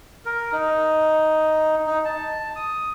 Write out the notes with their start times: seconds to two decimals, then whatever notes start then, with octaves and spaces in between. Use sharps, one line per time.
0.25 A#4
0.52 D#4
1.87 D#4
2.05 A5
2.56 D#6